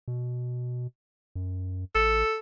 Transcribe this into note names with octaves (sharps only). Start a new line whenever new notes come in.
B2
F#2
A1 A4